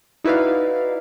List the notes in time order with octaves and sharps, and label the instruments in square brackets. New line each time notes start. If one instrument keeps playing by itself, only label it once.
[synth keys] D#4 E4 F#4 B4 D5 F5